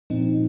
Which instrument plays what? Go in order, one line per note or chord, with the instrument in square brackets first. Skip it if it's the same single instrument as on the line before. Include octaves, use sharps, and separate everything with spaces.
[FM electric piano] A#2 F3 C4 D#4